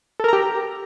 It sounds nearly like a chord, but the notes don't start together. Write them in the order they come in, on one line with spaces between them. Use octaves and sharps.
A4 A#4 A#5 G4